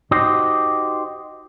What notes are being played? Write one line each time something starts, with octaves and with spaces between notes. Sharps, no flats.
D#4 F#4 G4 C5 D#5